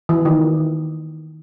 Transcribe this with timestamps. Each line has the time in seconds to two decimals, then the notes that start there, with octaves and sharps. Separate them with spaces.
0.09 E3
0.25 D#3